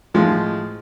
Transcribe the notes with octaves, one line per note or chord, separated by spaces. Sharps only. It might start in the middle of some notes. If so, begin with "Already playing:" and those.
A2 F3 G#3